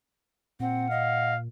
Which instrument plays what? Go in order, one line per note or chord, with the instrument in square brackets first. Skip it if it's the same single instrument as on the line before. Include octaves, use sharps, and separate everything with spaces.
[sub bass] A#2 [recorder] C4 [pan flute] F#5
[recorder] D#5 [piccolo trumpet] F5